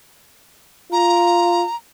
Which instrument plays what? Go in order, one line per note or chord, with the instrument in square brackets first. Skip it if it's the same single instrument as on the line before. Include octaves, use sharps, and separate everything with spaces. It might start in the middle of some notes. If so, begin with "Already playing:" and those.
[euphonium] F4 [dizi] A#5